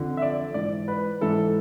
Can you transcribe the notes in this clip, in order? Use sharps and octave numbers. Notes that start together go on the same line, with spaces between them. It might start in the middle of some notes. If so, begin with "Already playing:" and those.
Already playing: F2 D3
E5
D5
G#2 E3 D5
B4
G#2 E3 A4